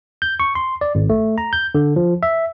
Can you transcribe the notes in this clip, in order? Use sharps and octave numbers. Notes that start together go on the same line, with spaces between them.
G6
C#6
C6
D5
G#1
A3
A#5
G6
D3
F3
E5